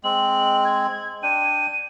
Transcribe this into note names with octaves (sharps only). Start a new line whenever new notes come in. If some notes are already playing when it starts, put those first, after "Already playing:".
G#3 C4 F#7
G#6
D4 G5 D#7